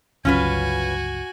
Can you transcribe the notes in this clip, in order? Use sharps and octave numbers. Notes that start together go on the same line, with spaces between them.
G1 C#2 F#3 C#4 F4 F#4 B4 G#5